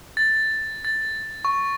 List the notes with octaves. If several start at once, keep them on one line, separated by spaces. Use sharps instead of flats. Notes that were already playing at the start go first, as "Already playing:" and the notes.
A6
A6
C#6